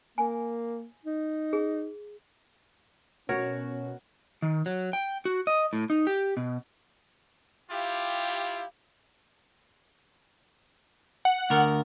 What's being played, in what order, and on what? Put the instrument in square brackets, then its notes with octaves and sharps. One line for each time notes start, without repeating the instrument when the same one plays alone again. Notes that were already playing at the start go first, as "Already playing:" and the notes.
[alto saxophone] A#3 [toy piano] G#5
[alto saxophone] D#4
[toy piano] G#4
[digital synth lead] B2 [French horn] C#4 [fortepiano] F#4 [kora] A#4 C#5
[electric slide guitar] D#3
F#3
G5
F#4
D#5
A2
D#4
G4
B2
[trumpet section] E4 F4 G4 [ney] F5
[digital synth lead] F#5
[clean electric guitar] D2 A#4